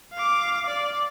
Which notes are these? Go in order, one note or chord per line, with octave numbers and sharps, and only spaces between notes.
F5 D6
D5